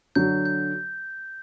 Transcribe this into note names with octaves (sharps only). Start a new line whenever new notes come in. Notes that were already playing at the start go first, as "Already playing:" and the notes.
D3 F#3 G6
G6